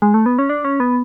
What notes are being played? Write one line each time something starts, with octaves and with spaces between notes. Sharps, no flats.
G#3
A3
B3
C#4
D4
C#4
B3